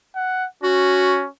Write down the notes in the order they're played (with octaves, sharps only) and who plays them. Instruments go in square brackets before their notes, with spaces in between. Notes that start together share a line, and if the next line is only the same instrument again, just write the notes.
[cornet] F#5
[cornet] C#4 [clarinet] F#4